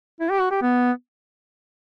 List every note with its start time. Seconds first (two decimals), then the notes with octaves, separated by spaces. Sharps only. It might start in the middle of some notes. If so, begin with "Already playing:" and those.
0.21 E4
0.31 G4
0.41 F#4
0.51 G4
0.62 B3